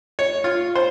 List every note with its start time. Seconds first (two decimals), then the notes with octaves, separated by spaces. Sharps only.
0.19 C#5
0.44 F4
0.75 C5